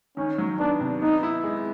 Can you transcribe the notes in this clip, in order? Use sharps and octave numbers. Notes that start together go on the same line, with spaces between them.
D#3 C#4
F#3
B3 D4
C3
B3 D#4
E4
G#3